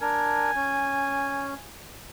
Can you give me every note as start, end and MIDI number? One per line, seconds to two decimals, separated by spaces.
0.01 0.51 62
0.01 0.51 70
0.01 1.70 80
0.56 1.54 61